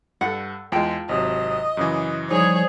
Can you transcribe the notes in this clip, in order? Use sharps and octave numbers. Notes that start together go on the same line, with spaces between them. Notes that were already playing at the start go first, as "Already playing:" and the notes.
G2 A4 F#5
E2 G#3 F4 G5 A5
G#1 C3 F#3 D#5
F#2 C#3 E3
F3 G3 D#4 G#4 C#5